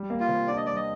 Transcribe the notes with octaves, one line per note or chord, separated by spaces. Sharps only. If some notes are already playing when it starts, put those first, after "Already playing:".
Already playing: G3
A#3
F4
C3
D4 D5
D#5
G3 D5
D#5